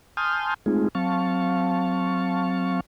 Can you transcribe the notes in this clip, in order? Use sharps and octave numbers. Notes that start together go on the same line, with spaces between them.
G#5 A5 C6 D#6 F6 G6
G#3 A3 C4 D#4 F4 G#4
F#3 C4 F5 A5 C#6